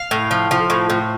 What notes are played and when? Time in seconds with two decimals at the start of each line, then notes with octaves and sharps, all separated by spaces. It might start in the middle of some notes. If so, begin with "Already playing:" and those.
Already playing: F5
0.11 A2
0.31 F3
0.51 F3
0.70 A2
0.90 A2